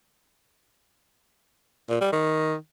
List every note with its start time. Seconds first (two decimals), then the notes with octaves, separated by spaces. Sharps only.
1.90 A#2
2.01 G3
2.13 D#3